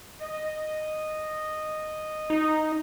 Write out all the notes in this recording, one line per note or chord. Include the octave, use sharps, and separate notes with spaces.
D#5
D#4